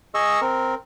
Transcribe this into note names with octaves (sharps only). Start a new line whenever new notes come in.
G#4 D#5 C#6 E6
C4 A#4